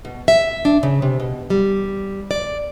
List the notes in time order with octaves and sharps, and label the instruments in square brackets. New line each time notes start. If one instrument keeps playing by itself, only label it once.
[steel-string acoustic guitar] B2
E5
D4
C#3
C3
B2
G3
D5